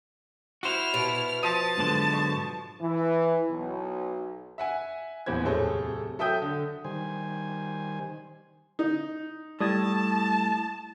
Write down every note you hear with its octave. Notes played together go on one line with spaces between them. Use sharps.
E4 F#4 C5 F6
B2
F3 A5 D#6
B1 G#2 D3
C#6
E3
B1
E5 F#5 G#5
D#1 E2 C5 G#6
D1 C3 G#4 A4 C5 C#5
F#3 A4 E5 G5 D#6 G6
D3
D#3 G3 C5 G#5
D#4
A2 G3 A5 D#6 G#6